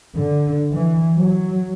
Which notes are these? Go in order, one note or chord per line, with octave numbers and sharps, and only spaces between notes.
D3
E3
F#3